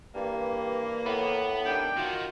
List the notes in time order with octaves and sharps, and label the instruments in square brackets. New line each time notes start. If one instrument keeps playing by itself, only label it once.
[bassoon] G2 [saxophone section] E3 A#3
[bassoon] A2 [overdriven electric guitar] B3
[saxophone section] D#3 G3 D4 [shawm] G5
[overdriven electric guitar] D#3 [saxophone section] F4 F#4